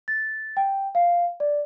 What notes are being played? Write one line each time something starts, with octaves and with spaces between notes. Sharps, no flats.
A6
G5
F5
D5